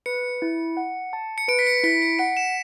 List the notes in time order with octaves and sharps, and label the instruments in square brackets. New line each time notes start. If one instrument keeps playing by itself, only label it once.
[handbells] B4 [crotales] C#7
[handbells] E4
F#5
A5
[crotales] C#7
[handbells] B4 [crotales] D7
[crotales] B6
C#7
[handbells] E4 [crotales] B6
[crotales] C#7
[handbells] F#5 [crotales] D7
[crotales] E7